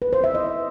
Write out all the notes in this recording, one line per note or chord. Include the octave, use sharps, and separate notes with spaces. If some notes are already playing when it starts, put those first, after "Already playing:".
B4
C5
E5
D#5